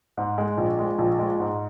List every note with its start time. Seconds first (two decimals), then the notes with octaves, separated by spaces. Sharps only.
0.17 G#2
0.38 G#3
0.57 A#1
0.79 G#3
0.98 A#1
1.19 G#3
1.40 G#2